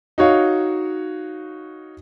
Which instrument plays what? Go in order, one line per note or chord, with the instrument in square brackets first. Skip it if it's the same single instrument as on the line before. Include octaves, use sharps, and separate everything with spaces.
[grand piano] D#4 F#4 C#5 F5